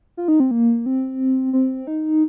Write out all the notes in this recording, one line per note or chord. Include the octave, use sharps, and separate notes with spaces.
F4
D#4
C4
A#3
C4
C4
D#4